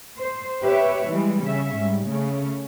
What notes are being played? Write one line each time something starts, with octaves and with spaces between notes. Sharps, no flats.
C5
G4 B4 C#5 E5
E3 G3 G#3
C#3 C#4 E5
G#2 G3
C#3 A3 C#4